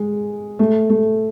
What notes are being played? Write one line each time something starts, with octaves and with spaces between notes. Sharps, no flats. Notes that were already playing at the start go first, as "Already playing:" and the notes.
Already playing: G#3
A3
A3